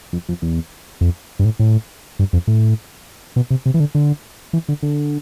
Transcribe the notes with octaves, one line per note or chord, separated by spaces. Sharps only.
F2
F2
E2
F2
G2
A2
A2
G2
F2
A2
B2
C3
C3
E3
D3
D3
E3
D3
D3